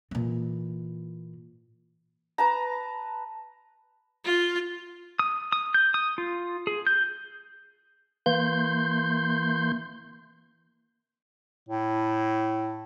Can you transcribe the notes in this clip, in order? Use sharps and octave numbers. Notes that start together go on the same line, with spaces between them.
A#2 E3
B4 A5 A#5
F4
D#6
D#6
G6
D#6
F4
G#4
G6
E3 A#3 C6 G6
A2